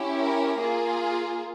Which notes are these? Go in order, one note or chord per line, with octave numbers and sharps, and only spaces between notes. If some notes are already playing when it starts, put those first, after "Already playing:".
Already playing: C#4 E4 G4
A#4
A#3 F4 G#4